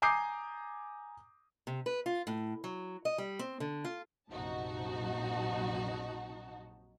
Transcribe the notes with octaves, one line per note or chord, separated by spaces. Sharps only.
G#5 A#5 D6 D#6 G6 C7
C3
B4
F4
A2
F#3
D#5
G3
C4
D3
F4
A#1 F#2 C3 D#4 F#4 A5